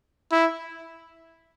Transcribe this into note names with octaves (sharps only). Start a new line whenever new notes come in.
E4